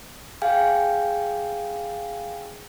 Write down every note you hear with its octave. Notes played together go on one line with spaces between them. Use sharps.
G#4 F5 G5 G#5